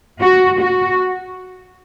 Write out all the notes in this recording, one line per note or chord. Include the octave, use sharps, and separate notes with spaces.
F#4
F#4